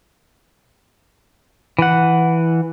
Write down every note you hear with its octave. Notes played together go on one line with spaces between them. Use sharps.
E3 F#5